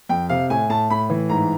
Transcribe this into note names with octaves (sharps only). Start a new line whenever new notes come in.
F2 G5
C3 F5
A2 G#5
A2 A5
A2 B5
E3
G#2 A#5